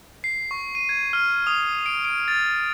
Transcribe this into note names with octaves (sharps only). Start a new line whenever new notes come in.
C7
C#6
D#7
G#6
F6
D#6
D7
D7
A6